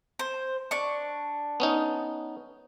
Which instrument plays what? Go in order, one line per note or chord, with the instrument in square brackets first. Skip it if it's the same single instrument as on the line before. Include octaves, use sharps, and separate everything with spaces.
[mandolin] C5
D4 C#6
[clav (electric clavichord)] B3 C#4 D#4